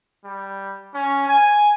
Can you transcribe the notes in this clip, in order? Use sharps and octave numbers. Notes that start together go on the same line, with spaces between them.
G3
C#4
G#5